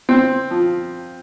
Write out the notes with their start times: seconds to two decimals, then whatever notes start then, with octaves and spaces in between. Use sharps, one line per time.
0.09 C4
0.51 F3